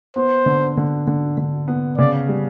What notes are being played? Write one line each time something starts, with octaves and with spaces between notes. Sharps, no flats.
B3 C5
D3
D3
D3
D3
B3
C#3 D5
G3